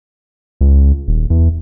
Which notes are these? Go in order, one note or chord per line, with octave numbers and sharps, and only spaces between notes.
C#2
D#1
E2